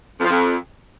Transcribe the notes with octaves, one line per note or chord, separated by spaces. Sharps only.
F2
F3
F2